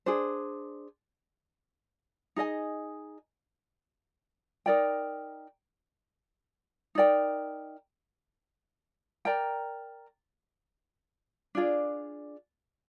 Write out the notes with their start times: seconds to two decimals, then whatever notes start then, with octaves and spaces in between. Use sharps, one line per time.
0.06 D4 G#4 C5
2.36 D#4 G#4 D#5 G#5
4.66 D#4 A#4 D5 G5
6.95 D#4 A#4 D5 G5
9.25 A#4 D5 G5 A#5
11.55 D4 F4 G#4 D5